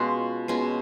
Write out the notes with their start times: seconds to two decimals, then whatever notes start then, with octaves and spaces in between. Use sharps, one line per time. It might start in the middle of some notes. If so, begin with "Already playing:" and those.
Already playing: B2 G#3 C#4 F4 F#5
0.48 B2 G#3 C#4 F4